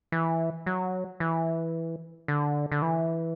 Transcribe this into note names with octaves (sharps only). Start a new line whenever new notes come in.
E3
F#3
E3
D3
D3
E3